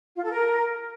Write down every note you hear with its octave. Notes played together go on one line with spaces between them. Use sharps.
F4
A4
A#4